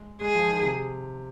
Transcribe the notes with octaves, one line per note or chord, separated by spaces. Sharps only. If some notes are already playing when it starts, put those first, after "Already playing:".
Already playing: G#3
G#3 G#4
F3
D#3
C3